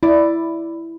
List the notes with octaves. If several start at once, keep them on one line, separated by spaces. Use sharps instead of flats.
E4 D5